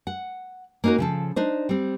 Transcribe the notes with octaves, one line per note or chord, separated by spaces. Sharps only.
F#5
A#3 C#4 D#4 F#4 A#4
C#3 F3 A4
D4 D#4 C5
G3 C4